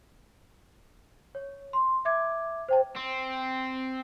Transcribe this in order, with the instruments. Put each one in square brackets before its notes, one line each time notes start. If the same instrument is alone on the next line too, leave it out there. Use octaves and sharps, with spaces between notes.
[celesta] C#5
C6
E5 D6 G#6
C5 G5 A5
[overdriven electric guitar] C4